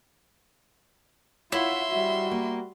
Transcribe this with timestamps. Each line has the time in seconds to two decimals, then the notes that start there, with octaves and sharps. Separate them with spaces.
1.52 E4 F4 C#5 E5 F#5 C6
1.89 G3 F#4
2.31 A#3